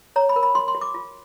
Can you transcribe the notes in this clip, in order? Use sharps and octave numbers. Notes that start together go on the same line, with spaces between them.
C#5 A#5
B5
A#4
B5
F#4 C6
C6
F#4
D6
F4